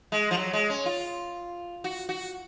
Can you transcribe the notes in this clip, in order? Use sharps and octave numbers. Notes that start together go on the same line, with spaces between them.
G#3
F3
F#3
G#3
C#4
F4
F#4
F#4